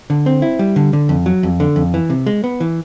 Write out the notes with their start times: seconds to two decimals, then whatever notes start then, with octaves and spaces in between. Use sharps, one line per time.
0.10 D3
0.26 C4
0.42 E4
0.59 G3
0.76 D3
0.93 D3
1.09 F2
1.26 F#3
1.43 F2
1.60 D3
1.76 F2
1.94 E3
2.10 C3
2.27 G#3
2.44 B3
2.60 E3